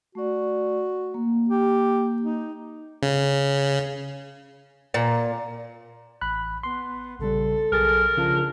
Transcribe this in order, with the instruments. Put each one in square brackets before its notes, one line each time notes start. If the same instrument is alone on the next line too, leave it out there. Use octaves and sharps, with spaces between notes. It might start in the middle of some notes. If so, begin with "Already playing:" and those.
[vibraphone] A3 D5 [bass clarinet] F#4
[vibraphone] A#3
[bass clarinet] G4
D#4
[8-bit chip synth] C#3
[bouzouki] A#2
[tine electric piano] A1 B5 F#6
[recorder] B3 [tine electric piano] C6
[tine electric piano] A#1 C#3 G3 [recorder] A4
[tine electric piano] B1 G#4 A6 [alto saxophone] A#4
[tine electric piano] C#3 F3 F4 [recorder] D4